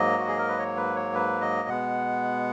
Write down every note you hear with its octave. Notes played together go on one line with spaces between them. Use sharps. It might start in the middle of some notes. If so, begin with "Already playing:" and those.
Already playing: G#2 F#3 A#3 D#5
F#4
G#4
A#4
B4
C#5
B4
C#5
B4
D#5
B2 G#3 B3 F#5